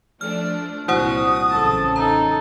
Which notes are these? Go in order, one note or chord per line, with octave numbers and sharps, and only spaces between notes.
F3 A3 D4 F6
C2 A#2 E4 F#4 C5 F#5 D#6
A1 C#3 F#3 A4 A5
D#4 A4 A#5